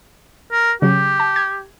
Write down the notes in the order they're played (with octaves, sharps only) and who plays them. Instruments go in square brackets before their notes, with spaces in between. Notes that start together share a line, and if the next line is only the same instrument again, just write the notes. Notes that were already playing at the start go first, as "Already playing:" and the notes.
[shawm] A#4
[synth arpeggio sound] C#3 F#3 [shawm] G4
[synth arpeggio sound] A5
G#6